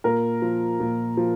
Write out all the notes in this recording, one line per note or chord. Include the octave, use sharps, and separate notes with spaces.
A#2 A#4
F3
A#2
F3